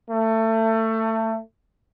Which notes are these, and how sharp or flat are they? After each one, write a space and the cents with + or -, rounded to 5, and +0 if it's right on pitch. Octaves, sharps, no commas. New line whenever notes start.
A3 +25